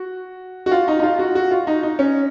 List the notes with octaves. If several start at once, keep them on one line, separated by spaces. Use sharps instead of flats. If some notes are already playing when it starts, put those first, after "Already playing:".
Already playing: F#4
F#4
F4
D#4
D#4
F4
F#4
F#4
F4
D#4
D#4
C#4